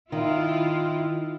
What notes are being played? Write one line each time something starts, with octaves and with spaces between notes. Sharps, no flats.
D#3 E4 F4